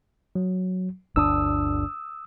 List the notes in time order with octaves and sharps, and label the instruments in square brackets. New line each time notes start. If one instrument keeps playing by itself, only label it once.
[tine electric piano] F#3
[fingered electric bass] G1 D2 D4 [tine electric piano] D#6 E6